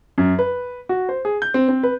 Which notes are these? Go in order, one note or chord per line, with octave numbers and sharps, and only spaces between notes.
F#2
B4
F#4
C5
G#4
G6
C4
C4
B4